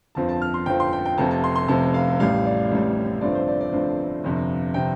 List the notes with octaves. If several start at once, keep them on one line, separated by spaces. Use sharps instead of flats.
G1 F2 F3 C4 A5
A5
F6
C6
G1 F2 F3 C4 G5
C6
G5
G5
F1 F2 C3 A5
A5
C6
C6
F1 F2 C3 A5
F5
A1 A2 G3 F5
D5
A1 A2 G3
G1 G2 F3 A3 C4 D5
C5
D5
D5
G1 G2 F3 A3 C4
G1 F2 C3
C3 G5